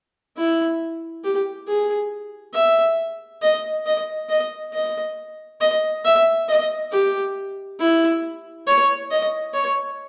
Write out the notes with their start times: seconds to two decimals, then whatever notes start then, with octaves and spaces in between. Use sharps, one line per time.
0.37 E4
1.24 G4
1.67 G#4
2.54 E5
3.42 D#5
3.86 D#5
4.29 D#5
4.73 D#5
5.61 D#5
6.05 E5
6.49 D#5
6.92 G4
7.80 E4
8.67 C#5
9.11 D#5
9.53 C#5